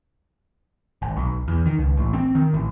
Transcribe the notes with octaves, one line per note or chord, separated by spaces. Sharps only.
G#1
B1
E2
D#3
C#2
A1
C4
D#3
A1